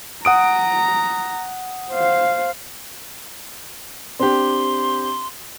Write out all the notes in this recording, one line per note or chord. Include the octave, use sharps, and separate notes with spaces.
F#5 A#5 D#6 D7
C5 F5
C4 D4 G4 C6